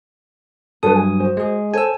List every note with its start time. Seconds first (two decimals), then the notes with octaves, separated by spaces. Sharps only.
0.83 G2 F#3 A4 B4 D#6
0.96 G#5
1.20 F#4 C5
1.37 G#3 G#4
1.74 A4 C5 C#5 G#5 E6